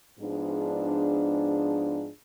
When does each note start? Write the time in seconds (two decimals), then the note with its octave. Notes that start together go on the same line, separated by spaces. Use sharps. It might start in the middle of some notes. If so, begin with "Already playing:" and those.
0.18 G#2 F3 B3 D4 G#4